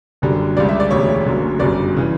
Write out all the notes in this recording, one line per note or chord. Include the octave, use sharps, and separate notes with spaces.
F#1 F#2 D3 G3
C#2 C#3 G3 D5
E5
D5
E1 D2 C#3 G3 C#5
F#1 F#2 D3 F#3
G1 F#2 C#3 G3 D5
C#3 E3